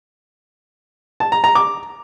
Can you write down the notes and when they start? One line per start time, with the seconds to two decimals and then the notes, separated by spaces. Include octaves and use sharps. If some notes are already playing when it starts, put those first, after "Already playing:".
1.20 A5
1.32 A#5
1.44 A#5
1.55 D6